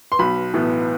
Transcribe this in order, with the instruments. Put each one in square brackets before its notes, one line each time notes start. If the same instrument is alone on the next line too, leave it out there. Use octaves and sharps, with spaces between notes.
[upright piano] C6
B1 B5
A2 E3 B3